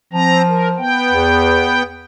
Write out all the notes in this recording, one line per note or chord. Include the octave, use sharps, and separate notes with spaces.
F3 C4 A#5
A#4
B3 G5
E2